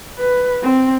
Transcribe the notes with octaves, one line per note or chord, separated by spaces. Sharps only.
B4
C4